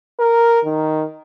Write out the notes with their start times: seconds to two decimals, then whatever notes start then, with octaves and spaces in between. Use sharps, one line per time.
0.19 A#4
0.65 D#3